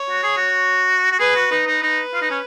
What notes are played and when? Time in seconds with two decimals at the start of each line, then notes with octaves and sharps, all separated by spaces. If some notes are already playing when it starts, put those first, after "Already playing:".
Already playing: C#5
0.10 F#4
0.23 G#4
0.37 F#4
1.11 F#4
1.19 G#4 B4
1.35 F#4
1.51 D#4
1.67 D#4 B4
1.83 D#4
2.14 F4
2.22 D#4
2.30 C#4